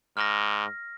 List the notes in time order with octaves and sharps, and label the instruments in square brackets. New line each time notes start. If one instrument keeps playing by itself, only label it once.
[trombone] G#2 [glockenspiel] F6 A#6